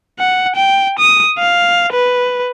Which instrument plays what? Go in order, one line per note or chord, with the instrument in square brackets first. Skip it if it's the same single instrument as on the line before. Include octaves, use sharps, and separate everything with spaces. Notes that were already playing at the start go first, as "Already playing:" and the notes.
[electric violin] F#5
G5
D#6
F5
B4